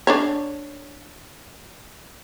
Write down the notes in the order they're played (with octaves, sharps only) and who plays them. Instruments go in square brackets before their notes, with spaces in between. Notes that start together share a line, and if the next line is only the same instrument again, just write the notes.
[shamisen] D4 A4 C#5